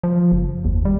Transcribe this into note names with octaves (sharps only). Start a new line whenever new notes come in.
F3
F#1
D#2
G3